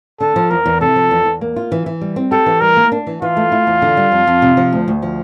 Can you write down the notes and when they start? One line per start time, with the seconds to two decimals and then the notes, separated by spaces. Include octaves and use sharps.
0.20 D3 A4
0.36 F3
0.50 E2 A#4
0.66 E2
0.81 C3 A4
0.96 F3
1.11 E2
1.26 E2
1.41 A#3
1.56 F4
1.72 E3
1.86 E3
2.01 G3
2.16 C4
2.32 G4 A4
2.46 E3
2.61 G3 A#4
2.77 A#3
2.92 D4
3.07 E3
3.22 E3 F4
3.37 A3
3.52 E4
3.67 E2
3.82 D3
3.97 G3
4.12 F2
4.27 F2
4.42 C3
4.57 F3
4.72 D2
4.88 D2
5.02 F3